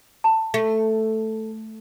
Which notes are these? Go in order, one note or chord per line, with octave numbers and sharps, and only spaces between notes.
A5
A3